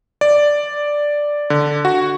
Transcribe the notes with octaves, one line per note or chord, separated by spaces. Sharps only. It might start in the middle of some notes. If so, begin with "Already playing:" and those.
D5
D3
F#4